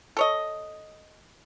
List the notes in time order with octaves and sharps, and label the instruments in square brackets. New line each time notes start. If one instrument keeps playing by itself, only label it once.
[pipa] A4 C#5 D#5